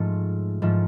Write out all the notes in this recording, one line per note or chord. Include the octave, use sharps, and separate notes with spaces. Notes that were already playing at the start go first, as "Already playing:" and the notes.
Already playing: G#2 F3 A3
G#2 F3 A3